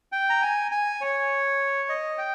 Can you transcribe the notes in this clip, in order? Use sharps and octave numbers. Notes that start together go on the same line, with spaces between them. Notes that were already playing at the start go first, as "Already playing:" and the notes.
G5
A#5
G#5
G#5
C#5
D#5
G5